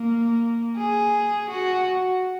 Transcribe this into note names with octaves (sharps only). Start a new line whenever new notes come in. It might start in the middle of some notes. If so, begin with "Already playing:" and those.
Already playing: A#3
G#4
F#4